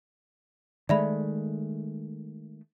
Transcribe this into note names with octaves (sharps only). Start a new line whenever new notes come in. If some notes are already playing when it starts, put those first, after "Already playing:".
D#3 G#3 A3 D5 E5 B5